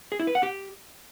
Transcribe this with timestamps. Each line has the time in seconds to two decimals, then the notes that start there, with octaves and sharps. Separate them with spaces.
0.12 G#4
0.20 E4
0.27 B4
0.35 F#5
0.43 G4